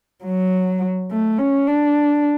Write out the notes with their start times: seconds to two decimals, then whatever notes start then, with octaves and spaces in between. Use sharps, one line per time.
0.24 F#3
1.11 A3
1.38 C#4
1.67 D4